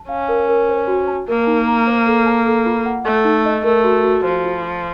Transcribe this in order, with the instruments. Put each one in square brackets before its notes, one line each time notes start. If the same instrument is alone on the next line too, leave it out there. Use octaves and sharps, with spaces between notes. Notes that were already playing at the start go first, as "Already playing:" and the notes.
Already playing: [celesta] A5
[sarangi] C#4 [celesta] F5
[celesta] A#4
A#4
C5
F#4
A5
[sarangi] A#3 [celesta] A#4
[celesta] D#4
A#5
C5
A4
A5
A4
F4
F#5
[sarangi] A3 [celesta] A4
[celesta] D#4
D#5
[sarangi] A3 [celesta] A#4
[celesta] F#4
F#4
[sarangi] F3 [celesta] C5
[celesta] F4
F4